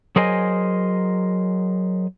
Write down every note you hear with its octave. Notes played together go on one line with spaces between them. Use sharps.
F#3 G#4 A#4 C5 D#5 G#5